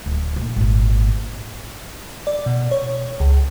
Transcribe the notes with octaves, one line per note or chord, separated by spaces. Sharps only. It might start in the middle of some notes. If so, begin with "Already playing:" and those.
D1
A#1
G#1 A#2
D5
B2
C#5
C#2